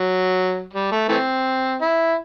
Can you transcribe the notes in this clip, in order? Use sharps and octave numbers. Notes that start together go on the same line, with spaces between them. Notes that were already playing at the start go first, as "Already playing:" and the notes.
Already playing: F#3
G3
A3
E3 A3 C4
E4